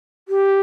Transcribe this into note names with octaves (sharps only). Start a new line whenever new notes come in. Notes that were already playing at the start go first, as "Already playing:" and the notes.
G4